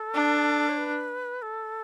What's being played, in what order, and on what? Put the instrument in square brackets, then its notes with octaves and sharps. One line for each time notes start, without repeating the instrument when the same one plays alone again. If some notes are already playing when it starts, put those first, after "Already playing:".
Already playing: [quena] A4
[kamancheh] D4
[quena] C#5
B4
A4